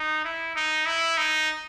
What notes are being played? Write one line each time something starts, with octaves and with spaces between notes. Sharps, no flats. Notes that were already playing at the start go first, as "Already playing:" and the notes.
Already playing: D#4
E4
D#4
E4
D#4